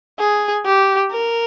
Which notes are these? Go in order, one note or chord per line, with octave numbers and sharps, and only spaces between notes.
G#4
G4
A#4